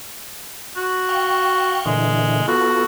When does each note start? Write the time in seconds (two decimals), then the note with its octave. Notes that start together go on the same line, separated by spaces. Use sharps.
0.76 F#4
1.09 F5 G5 C#6
1.86 A#2 D3 E3 G#3
2.48 B3 F4 F#4 A4